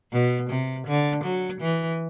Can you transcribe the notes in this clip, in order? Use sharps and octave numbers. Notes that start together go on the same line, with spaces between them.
B2
C3
D3
F#3
E3